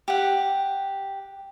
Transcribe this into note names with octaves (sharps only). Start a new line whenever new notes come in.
G4 F#5